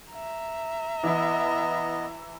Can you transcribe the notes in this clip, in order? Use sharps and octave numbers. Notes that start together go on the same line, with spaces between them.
E5 A#5
E3 B3 E4 D#5